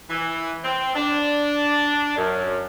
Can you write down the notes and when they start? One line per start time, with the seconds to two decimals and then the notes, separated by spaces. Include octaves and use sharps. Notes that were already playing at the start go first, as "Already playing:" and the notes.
0.09 E3
0.64 C4
0.95 D4
2.16 F#2